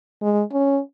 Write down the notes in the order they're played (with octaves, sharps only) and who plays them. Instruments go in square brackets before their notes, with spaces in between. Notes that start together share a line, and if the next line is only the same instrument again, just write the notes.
[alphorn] G#3
C#4